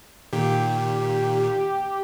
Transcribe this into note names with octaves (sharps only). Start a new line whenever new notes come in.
A#2 D#3 G4